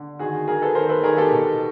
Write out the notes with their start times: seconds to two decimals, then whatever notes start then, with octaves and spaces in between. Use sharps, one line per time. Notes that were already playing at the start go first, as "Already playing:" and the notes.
Already playing: D3
0.19 D#3 F#4 G#4
0.48 F#3 G#4 A#4
0.62 A4 B4
0.75 D#3 A#4 C5
0.89 A4 B4
1.04 D#3 G#4 A#4
1.17 G4 A4
1.32 B2